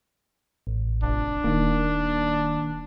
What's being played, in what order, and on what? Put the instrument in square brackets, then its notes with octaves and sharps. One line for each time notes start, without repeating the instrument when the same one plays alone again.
[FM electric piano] A1
[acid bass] F1 [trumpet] D4
[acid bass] D#1 [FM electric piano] D#3 A#3